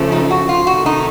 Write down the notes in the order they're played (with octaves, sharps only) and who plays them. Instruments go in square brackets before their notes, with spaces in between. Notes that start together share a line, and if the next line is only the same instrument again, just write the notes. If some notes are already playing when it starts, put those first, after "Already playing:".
Already playing: [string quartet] C#3 F3 A3
[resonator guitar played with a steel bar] D#4
F#4
F4
[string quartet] C3 D#3 A3 [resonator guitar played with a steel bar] F#4
[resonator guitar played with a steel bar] D#4